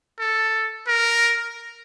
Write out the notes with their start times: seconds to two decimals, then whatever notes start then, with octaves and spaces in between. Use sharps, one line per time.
0.19 A4
0.87 A#4